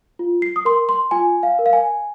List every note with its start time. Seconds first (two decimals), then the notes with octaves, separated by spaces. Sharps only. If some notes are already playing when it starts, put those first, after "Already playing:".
0.19 F4
0.42 C7
0.56 D#6
0.65 A#4 C6
0.89 C6
1.11 F4 G#5
1.43 F5
1.59 A#4
1.66 F5
1.73 G#5